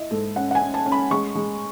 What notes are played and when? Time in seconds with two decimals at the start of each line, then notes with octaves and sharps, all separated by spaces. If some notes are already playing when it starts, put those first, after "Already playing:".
Already playing: E4 D#5
0.11 G#2 A4
0.36 C#4 F#5
0.51 F#5
0.55 G#5
0.61 C#4
0.74 A5
0.86 C#4
0.92 B5
1.11 G#3 C#6
1.35 G#3